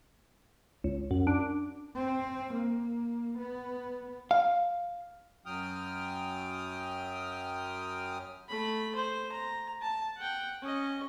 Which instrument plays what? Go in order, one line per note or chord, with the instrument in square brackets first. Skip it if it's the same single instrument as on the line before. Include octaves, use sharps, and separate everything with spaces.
[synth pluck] C#2
F#2
D4
[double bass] C4
A#3
B3
[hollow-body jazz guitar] F5
[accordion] F#2 F#3 G5 D#6 F6
[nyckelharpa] A3 B5
C5
A#5
A5
F#5 G5
C#4 D#5